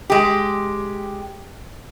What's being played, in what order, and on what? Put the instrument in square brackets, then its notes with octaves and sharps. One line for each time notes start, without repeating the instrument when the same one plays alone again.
[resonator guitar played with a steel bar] G#3 G4